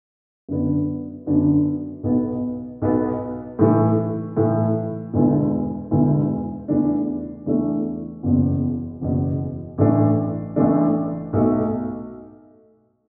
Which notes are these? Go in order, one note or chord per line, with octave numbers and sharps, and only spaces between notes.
F#2 D3 B3 D4
F#2 D3 B3 D4
B1 B2 B3
B1 B2 B3
A2 E3 A3
A2 E3 A3
E1 D2 D3 B3 E4
E1 D2 D3 B3 E4
E2 E3 A3 D4
E2 E3 A3 D4
F#1 E2 B2
F#1 E2 B2
A1 A2 E3 A3 D4
A1 A2 E3 A3 D4
B1 B2 A3